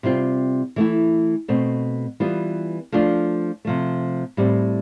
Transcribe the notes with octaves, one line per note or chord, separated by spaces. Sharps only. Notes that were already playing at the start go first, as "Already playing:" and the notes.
C3 G3 C4 F4
E3 A3 E4
B2 A3 C4
E3 G3 B3 F4
F3 A3 D4 F4
C3 F3 A3
A2 G3 C4